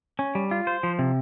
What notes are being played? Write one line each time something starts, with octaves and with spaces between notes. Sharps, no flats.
C#4
G3
F4
C5
F3
C3